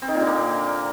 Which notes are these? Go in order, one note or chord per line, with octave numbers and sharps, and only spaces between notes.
C4
D#3
A#2
D3
A#3